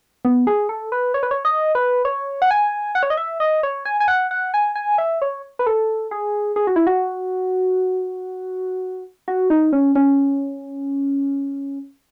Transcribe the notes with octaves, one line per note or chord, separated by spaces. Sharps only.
B3
G#4
A4
B4
C#5
B4
C#5
D#5
B4
C#5
F#5
G#5
F#5
C#5
D#5
E5
D#5
C#5
G#5
G#5
F#5
F#5
G#5
G#5
E5
C#5
B4
A4
G#4
G#4
F#4
E4
F#4
F#4
D#4
C#4
C#4